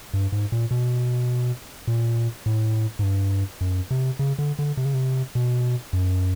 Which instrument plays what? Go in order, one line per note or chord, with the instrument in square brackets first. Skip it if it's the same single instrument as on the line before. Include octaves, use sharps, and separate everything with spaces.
[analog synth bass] G2
G#2
A#2
B2
A#2
A2
G#2
G2
F#2
C3
C#3
D3
D3
C3
C#3
C3
B2
F#2